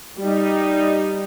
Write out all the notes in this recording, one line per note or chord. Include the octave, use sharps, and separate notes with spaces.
G3 D#4